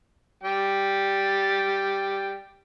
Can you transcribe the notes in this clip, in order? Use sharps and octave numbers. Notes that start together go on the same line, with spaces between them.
G3 G5